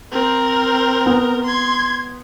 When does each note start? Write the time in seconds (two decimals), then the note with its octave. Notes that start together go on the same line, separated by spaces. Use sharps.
0.12 C4 A#4
1.06 B3
1.44 C6 G#6